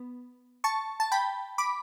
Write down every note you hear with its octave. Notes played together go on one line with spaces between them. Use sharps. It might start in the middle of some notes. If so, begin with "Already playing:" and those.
Already playing: B3
A5 C#6
A5
G5 B5
B5 D6